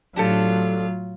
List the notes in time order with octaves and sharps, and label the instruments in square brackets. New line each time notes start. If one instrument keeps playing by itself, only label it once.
[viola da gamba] A2 F4 [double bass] F#3 [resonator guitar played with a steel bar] D4 G4 A4